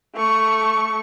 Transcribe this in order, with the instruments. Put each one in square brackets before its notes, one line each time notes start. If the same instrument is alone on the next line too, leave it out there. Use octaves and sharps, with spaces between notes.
[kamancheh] A3 C#6